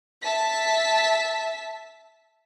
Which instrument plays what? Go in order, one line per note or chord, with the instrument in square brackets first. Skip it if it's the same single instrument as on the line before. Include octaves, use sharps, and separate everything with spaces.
[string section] E5 A5 B6